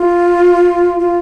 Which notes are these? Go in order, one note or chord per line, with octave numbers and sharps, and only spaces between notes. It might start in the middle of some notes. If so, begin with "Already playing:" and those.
Already playing: F4
F4